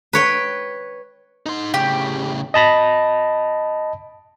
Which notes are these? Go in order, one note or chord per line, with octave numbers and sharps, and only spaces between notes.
B4 C#5 G5
D#4 C6
A2 C#3 G4
D#5 A5 B5 A#6